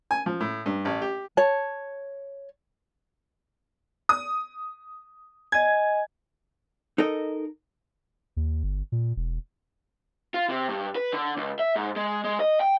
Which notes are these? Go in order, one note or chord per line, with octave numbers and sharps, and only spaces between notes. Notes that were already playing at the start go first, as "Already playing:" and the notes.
G#5
F3
A2
G2
A1
G4
C#5 A5
D#6
D#5 G#5 G#6
D#4 A4 A#4 D#5
D#2
G1
A#2
E1
F4
C3
G2
B4
D3
C#2
E5
G#2
G#3
G#3
D#5
G5